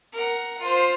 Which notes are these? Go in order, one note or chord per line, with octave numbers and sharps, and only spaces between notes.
A#4 F#5
F4 C5